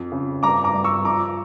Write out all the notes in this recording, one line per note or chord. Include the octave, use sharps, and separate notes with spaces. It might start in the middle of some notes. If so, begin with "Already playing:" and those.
Already playing: F2
C#3
G2 A#5 D6
A#5 D6
G2
C#6 E6
F3 A#5 D6